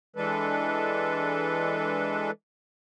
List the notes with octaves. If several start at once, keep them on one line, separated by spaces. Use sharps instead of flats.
E3 G#3 D4 A4 B4